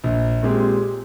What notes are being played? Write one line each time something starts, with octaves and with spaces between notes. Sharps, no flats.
A#1
A#2 G#3 C4 G4